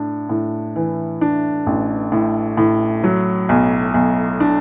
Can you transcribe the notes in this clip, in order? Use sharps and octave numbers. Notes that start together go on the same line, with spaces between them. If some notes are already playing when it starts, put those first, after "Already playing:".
Already playing: A2 D4
A2
E3
D4
A1
A2
A2
F#3
B1
B1
D4